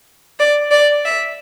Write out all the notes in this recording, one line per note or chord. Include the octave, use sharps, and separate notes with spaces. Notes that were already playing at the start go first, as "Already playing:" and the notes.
D5
D5
E5